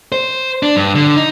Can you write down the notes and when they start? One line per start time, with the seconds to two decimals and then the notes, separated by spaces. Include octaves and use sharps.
0.12 C5
0.63 D4
0.76 G2
0.95 D3
1.16 D#4